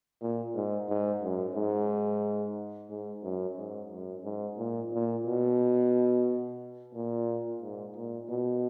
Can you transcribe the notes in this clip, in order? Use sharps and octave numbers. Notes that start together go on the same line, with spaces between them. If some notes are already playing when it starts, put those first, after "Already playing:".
A#2
G#2
G#2
F#2
G#2
G#2
F#2
G#2
F#2
G#2
A#2
A#2
B2
A#2
G#2
A#2
B2